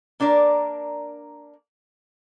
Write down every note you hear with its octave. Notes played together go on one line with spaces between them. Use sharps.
A#3 D4 A#4 D5